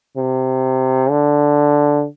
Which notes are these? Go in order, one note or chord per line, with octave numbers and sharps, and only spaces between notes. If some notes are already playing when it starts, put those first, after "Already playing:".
C3
D3